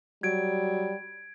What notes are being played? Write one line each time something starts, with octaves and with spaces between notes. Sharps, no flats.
F#3 G3 G#6 D7